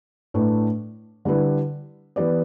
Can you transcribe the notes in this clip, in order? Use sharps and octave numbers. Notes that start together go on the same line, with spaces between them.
A2 A3 D4 B4
D3 G3 E4 B4
E3 B3 G4 B4 D5